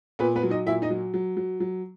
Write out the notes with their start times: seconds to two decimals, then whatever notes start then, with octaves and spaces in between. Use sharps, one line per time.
0.19 A#2 B3 B4
0.36 B3 B4
0.43 F#3
0.50 D#4 D#5
0.67 A#2 E4 E5
0.82 D#4 D#5
0.90 F#3
1.14 F#3
1.37 F#3
1.60 F#3